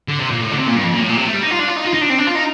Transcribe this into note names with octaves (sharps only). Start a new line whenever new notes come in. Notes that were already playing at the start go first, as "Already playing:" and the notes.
D3
C3
A#2
A2
D3
C3
A#2
G2
F2
A#2
A2
A#2
C3
A3
G3
D#4
F4
D4
F4
D#4
F4
D#4
D4
C4
D4
F4
D#4